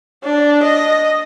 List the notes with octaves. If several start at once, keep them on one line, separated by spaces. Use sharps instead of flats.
D4
D#5